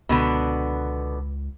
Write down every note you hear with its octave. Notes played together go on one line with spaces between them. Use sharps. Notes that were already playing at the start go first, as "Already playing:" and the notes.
C#2 B2 D3 B3